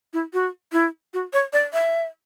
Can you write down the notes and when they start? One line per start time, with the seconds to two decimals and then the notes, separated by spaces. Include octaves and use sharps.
0.13 E4
0.33 F#4
0.73 E4
1.14 F#4
1.33 C#5
1.53 D5
1.73 E5